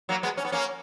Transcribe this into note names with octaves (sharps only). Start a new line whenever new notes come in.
F#3 A#3
G#3 B3
C#4
B3
A#3 C#4